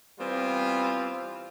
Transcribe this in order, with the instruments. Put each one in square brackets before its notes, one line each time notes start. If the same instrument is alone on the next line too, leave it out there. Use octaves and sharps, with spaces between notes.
[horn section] E3 G3 B3 C4 F4